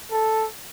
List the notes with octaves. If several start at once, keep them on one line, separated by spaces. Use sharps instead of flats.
A4